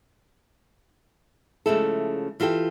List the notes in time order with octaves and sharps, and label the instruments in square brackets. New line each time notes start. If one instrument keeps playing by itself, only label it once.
[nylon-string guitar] C#3 F3 G#3 A3 E4 A4
E3 F4 G4 A4 G5